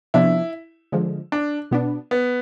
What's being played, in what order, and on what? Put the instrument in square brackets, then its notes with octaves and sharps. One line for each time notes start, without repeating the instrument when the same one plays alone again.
[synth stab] C3 F3 B3 D4 [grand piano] E4
[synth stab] D3 F3 G#3
[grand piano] D4
[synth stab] B2 B3 D4
[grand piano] B3